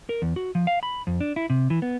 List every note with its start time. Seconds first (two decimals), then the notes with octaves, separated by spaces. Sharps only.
0.09 A#4
0.22 E2
0.36 F#4
0.55 F3
0.67 F5
0.83 B5
1.07 F2
1.21 D4
1.36 E4
1.50 C3
1.70 E3
1.82 B3